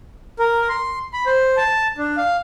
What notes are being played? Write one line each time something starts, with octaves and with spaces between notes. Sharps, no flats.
A#4
C6
B5
C5
A5
D4
F5